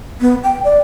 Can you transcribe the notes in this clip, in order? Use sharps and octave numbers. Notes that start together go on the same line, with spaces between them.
B3
G5
D5